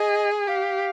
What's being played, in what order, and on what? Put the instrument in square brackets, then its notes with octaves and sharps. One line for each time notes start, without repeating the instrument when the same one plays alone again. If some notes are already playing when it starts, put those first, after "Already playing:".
Already playing: [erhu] G#4 [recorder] D#5
[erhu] G4 [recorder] F5